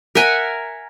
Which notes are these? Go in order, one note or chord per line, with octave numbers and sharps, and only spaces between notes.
A#4 E5 F#5 G#5